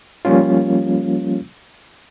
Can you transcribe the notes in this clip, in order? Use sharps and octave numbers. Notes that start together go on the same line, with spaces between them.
F3 G3 A#3 C#4 F4